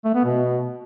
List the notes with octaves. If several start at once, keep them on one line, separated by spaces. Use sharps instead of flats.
A3
B3
B2